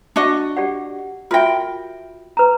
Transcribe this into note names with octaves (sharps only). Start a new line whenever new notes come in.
D4 F#4 D#5
G4 D5 F#5
F4 F#4 A#4 E5 G5
B4 A#5